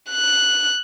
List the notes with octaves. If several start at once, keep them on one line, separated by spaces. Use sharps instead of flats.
F#6